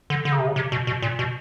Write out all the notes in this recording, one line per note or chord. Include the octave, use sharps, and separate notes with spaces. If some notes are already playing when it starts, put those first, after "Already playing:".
D3
D3
C#3
C3
C#3
C3
B2
B2
A#2
B2